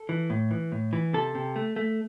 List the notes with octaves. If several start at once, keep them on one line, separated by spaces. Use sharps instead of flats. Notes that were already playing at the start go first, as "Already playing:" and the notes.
Already playing: A4
E3
A2
E3
A2
E3
C3 A4
C3
A3
A3